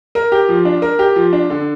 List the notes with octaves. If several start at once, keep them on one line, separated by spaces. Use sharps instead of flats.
A#4
G4
F3
D4
A#4
G4
F3
D4
D3